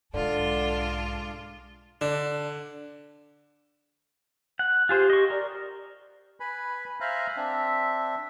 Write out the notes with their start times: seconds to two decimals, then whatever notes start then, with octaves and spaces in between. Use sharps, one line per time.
0.14 B1 G#2 D3 G#3 D4 F4
2.01 D3 D4
4.59 F#5
4.89 F4 G4 G#4 C5
5.10 D#5 C#6
5.30 A#4 D5
6.40 B4 G#5 B5
7.00 C5 E5 F5 G#5 A#5 F#6
7.37 C4 D4 E5